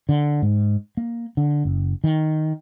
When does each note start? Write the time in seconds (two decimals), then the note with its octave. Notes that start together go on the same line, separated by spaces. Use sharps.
0.09 D3
0.42 G#2
0.97 A#3
1.37 D3
1.65 F#1
2.04 D#3